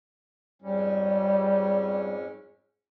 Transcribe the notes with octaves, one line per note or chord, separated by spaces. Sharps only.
F2 G#2 G3 C#4